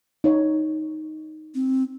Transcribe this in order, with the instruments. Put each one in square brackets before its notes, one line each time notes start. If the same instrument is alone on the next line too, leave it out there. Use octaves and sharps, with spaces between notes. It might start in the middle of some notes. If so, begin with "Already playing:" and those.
[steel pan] D#4 C#5
[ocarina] C4